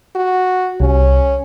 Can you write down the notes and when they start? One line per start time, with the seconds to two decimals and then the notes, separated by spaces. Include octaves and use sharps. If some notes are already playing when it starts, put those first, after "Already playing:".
0.16 F#4
0.80 C2 C#4